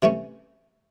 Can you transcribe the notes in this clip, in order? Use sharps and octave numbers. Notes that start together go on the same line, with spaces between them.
C3 E3 A3 C#4